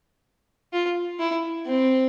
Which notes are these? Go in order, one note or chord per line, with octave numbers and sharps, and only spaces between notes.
F4
E4
C4